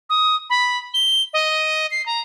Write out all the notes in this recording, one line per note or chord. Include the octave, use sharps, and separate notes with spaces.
D#6
B5
G7
D#5
C7
A#5